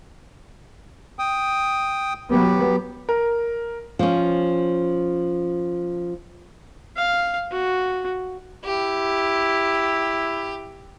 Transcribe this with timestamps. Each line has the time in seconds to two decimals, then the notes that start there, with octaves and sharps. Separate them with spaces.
1.19 G5 D#6
2.31 F#3 B3 G4
3.09 A#4
3.99 F3 C#4
6.97 F5
7.52 F#4
8.65 E4 G4